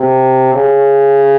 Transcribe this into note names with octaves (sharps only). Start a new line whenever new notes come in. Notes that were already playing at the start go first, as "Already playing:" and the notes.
Already playing: C3
C#3